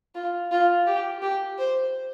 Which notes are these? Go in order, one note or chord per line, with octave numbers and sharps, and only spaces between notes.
F4
F4
G4
G4
C5